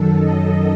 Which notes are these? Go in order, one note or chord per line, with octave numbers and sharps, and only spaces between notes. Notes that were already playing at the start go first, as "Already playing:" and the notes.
Already playing: F#2 D#3 F#3 A4
D#5